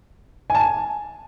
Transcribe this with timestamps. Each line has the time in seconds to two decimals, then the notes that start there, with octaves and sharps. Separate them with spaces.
0.50 G#5
0.55 A5
0.60 G#5